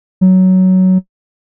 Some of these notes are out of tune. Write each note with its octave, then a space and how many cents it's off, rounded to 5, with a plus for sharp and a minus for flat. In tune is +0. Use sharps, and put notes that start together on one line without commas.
F#3 +10